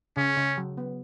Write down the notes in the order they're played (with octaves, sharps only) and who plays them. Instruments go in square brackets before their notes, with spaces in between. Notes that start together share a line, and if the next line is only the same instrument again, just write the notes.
[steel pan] C#3 [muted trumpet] C#4
[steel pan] C#3
F#3
B3